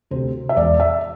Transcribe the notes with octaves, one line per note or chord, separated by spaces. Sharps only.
D2 C3 C5
E5
E1 D5
E5